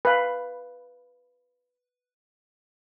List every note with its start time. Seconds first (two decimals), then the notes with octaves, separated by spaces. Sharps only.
0.05 B4 F5